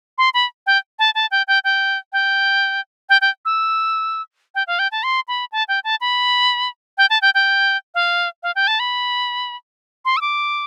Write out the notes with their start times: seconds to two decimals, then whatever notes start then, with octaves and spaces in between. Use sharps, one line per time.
0.18 C6
0.34 B5
0.66 G5
0.99 A5
1.15 A5
1.31 G5
1.48 G5
1.64 G5
2.13 G5
3.09 G5
3.21 G5
3.45 E6
4.55 G5
4.67 F5
4.79 G5
4.92 A5
5.03 C6
5.28 B5
5.52 A5
5.68 G5
5.84 A5
6.01 B5
6.98 G5
7.10 A5
7.22 G5
7.35 G5
7.95 F5
8.43 F5
8.56 G5
8.67 A5
8.80 B5
10.05 C6
10.17 E6
10.21 D6